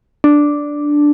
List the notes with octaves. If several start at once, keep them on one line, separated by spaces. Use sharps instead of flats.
D4